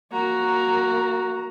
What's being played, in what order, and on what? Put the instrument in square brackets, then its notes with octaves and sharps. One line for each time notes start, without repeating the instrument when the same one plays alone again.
[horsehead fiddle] A#3 A#5 [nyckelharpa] F#4